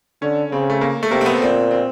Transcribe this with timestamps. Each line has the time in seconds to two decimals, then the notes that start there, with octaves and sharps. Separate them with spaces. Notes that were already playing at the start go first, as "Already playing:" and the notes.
0.22 D3 C#4
0.52 C#3 C4
0.70 A3
0.81 A#3
1.03 A3
1.11 C3 A#3
1.21 C4
1.26 B3
1.41 A#2 C4
1.71 C4